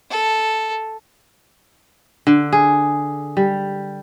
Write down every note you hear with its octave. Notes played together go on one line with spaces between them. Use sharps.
A4
D3
G#4
G3